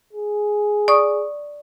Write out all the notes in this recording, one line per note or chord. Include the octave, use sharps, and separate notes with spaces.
G#4
D5 C#6 D#6